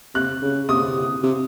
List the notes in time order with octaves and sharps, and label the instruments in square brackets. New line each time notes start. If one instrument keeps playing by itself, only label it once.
[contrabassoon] C3 [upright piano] F#6
[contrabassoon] C#3
[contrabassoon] C3 [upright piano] D#6
[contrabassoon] C3